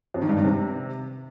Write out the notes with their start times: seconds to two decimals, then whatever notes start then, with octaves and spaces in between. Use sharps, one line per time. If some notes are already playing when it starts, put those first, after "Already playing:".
0.14 F2
0.22 D#3
0.29 G2
0.37 D#3
0.44 C3